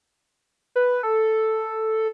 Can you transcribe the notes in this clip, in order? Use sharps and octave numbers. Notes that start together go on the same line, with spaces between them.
B4
A4